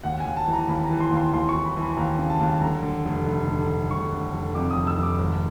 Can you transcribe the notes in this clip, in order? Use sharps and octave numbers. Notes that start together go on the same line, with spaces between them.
D#2 F#5
D#2 G#5
A5
E3
A#5
D#2 B5
A#5
E3
C6
D#2
C6
D#2 C6
C#6
E3
B5
E3
B5
D#2 A#5
C#3
A5
D#2
D3 A#5
D3
F1
F1
D3
D3
F1 C#6
D3
F1
F2 D6
D#6
F1
E6
F1 D6
G#1